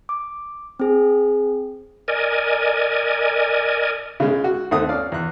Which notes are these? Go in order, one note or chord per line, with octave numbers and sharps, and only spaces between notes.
D6
C4 G#4
A#4 D5 D#5 G#5
C#3 G#3
F#4
D#2 A3 C4 D#4 F#5 D#6
C#4 D5 F5
E2 F#6